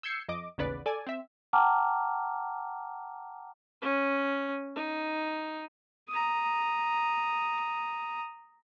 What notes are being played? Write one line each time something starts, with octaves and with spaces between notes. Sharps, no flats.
E6 G6 G#6 C7 C#7
F2 D#5 D6
A1 D#2 C#3 B3 B4 D5
A4 D5 G#5
C4 E5
F#5 G5 A5 A#5 D6 F6
C#4
D#4
A#5 D#6